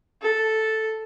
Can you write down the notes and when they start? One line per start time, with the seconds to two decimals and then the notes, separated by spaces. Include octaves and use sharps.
0.22 A4